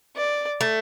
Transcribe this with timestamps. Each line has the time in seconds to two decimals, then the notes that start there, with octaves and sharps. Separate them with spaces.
0.16 D5
0.61 A3